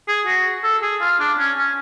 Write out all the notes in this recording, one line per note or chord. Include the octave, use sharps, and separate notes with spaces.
G#4
F#4
A4
G#4
F4
D4
C#4
C#4